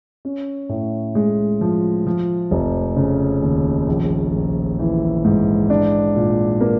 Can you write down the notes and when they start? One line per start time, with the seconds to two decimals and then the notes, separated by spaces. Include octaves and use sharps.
0.25 C#4
0.69 A2
1.15 G#3
1.61 F3
2.07 F3
2.51 F1
2.96 C#3
3.42 D#2
3.88 A#1
4.34 A#1
4.79 E3
5.25 G#2
5.70 D4
6.16 A#2
6.61 A#3